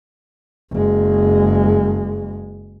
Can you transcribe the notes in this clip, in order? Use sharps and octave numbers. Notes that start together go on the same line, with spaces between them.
F#1 G#3